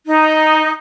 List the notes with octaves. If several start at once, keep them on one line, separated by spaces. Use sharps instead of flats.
D#4